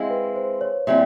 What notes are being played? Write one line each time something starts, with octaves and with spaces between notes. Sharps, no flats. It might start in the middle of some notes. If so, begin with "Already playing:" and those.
Already playing: G#3 C4 E4 F5
B4
C5
C#5
A#2 G3 C4 E4 E5